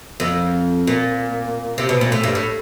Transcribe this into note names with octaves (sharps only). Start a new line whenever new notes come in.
F2
A#2
C3
B2
A#2
A2
G2
A2